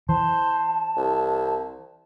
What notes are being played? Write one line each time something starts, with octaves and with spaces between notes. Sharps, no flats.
E3 C5 A5
C2